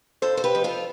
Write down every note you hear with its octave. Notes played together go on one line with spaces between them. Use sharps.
F2 A4 C5
C5
G4 B4
F2
F4 A4